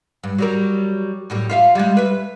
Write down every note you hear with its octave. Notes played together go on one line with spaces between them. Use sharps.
G2
F#3 G3 A#4
F#2 A2 G3
F4 E5 F5
G3 G#3
B4 E5